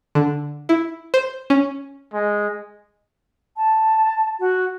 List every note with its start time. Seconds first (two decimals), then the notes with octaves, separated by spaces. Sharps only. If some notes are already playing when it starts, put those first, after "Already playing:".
0.15 D3
0.69 E4
1.14 C5
1.50 C#4
2.13 G#3
3.57 A5
4.40 F#4